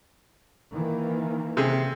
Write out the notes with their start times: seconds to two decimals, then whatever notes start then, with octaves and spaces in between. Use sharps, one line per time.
0.74 D#3 E3 A#3
1.57 C3 G#4